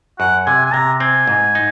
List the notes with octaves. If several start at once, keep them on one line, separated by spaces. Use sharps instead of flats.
F#2 F#5
C3 G#5
G#5
C3 A#5
C4 G#5
G#2
D#4